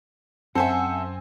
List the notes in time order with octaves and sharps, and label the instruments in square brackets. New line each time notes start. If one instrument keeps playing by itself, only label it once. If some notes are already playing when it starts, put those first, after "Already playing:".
[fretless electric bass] F#2 [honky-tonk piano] C4 G#5 [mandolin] A4 C5 E5 [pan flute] F#5